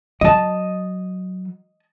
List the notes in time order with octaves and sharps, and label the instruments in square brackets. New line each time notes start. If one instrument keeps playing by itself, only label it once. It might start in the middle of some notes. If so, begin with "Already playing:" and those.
[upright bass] F#3 [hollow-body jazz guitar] D#5 A5